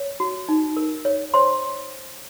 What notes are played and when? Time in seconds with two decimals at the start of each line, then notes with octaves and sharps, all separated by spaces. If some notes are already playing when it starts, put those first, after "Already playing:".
Already playing: C#5
0.20 F#4
0.49 D#4
0.77 A#4
1.05 C#5
1.34 C5 C#5 C6